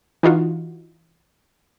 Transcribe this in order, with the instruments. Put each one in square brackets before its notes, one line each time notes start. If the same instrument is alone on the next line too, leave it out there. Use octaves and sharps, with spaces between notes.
[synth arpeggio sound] E3 D#4 F4 F#4